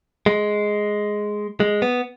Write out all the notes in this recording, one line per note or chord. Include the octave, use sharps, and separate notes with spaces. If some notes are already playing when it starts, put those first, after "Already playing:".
G#3
G#3
B3